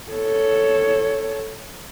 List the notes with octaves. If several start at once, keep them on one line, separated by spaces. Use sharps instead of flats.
A4 C#5